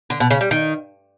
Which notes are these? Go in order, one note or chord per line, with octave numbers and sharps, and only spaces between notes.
D3
B2
C#3
G3
D#3